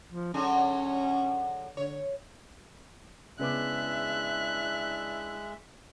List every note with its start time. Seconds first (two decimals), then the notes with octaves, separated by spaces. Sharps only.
0.13 F3
0.34 D3 F#3 C#4 G#4
1.77 D3 C#5
3.39 C#3 G#3 B3 D4 E4 E5 D6 F#6